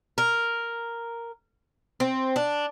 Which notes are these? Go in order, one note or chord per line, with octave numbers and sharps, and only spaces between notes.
A#4
C4
D4